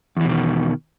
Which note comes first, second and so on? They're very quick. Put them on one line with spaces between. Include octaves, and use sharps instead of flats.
E2 E3 B2 D#3